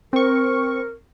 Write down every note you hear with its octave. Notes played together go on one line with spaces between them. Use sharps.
C4 A#4 C#6